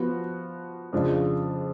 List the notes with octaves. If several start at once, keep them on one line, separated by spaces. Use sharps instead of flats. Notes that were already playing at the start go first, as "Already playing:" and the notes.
Already playing: F3 B3 F#4
F2 C#3 G#3 D4 F4